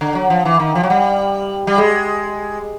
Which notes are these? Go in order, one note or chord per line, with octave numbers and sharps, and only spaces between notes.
D3
F#3
F3
E3
D#3
F3
F#3
G3
G3
G#3